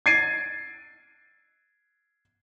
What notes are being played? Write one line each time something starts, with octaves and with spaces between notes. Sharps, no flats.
G#6 A6 C7 D7 D#7